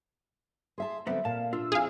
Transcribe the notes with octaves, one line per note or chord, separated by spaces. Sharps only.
G#4 E5 A5 C6
D3 F#3 G3 B3 C4 E5
A#2 F5 A5
D4 F4 E6
F2 C4 E4 G#4 F5